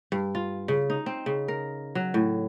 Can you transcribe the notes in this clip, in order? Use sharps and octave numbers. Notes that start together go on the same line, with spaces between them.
G2
F4
C#3
D#4
C4
C#3
A#4
F#3
A2